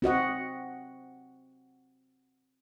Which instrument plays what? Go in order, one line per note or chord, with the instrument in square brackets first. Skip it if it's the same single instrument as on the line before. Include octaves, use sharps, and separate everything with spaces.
[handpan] C4 F#4 D#5 F#5